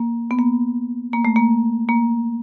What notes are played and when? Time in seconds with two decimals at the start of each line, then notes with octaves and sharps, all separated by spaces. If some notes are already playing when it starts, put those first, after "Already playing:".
Already playing: A#3
0.31 B3
0.39 A#3
1.13 A#3
1.25 A3
1.36 A#3
1.89 A#3